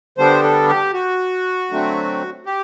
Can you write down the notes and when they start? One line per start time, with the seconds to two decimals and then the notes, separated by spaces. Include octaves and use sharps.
0.18 D3 G3 B3 D4 C5
0.43 A4
0.69 G4
0.93 F#4
1.70 D3 F#3 A3 C4
2.46 G4